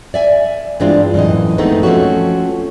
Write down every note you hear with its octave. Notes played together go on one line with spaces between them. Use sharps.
D5 E5 G#5
G2 E3 G#3 C4 D4 F4
F#2 A2 E3 D#5
F3 G#3 A3 B3 C4 D#4
F3 A3 C4 C#4 F#4